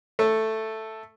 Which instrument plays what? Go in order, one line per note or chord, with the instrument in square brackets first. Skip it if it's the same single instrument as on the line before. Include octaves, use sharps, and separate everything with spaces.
[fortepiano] A3 A4